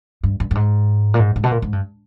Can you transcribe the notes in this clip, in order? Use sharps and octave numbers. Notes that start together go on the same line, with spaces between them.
G2
G2
G2
G#2
A#2
G#2
G#2
B2
A#2
G#2
G2